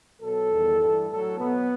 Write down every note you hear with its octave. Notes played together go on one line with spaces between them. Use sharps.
B2 F#3 A4
E2 D#3 G3
G2 E3 G3
A2 F#3 A4
B2 F#3 B3